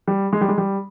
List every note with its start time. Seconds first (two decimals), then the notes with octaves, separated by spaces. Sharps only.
0.07 G3
0.33 G#3
0.41 G3
0.49 G#3
0.58 G3